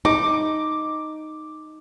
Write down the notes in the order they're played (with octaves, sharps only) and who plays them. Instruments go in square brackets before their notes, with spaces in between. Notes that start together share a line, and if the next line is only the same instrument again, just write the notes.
[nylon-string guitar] D#4 [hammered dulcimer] D6